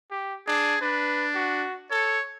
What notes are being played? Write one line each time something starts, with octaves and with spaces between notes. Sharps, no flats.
G4
D4 G#4
D4 B4
F#4
A4 C#5